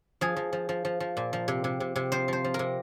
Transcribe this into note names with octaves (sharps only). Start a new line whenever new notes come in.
F3 G#4
F3
F3
F3
F3
F3
A#2
F3
C3
C3
C3
C3
F3 C5
F3 C5
F3
C3 A#4